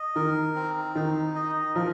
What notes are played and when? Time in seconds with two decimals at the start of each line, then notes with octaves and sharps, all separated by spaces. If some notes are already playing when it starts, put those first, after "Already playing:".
Already playing: D#5
0.15 D#3 A#4
0.55 C4
0.95 D#3 D#4
1.35 D#5
1.75 F3 A#4